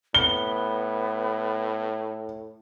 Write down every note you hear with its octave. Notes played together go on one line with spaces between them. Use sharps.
A2 B3 G7